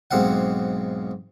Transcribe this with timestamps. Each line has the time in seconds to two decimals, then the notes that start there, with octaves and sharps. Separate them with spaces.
0.11 B1 G#2 C4 F5 F#5